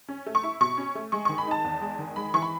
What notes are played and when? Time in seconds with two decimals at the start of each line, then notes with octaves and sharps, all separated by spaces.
0.08 C#4
0.26 A3
0.35 C#6
0.43 E4
0.61 B2 C#6
0.78 C#4
0.95 A3
1.12 G#3 C#6
1.25 D#3 C#6
1.38 B5
1.47 D#4 A5
1.64 E2
1.81 G#3
1.99 D#3
2.16 G#3 B5
2.34 E3 C#6
2.42 B5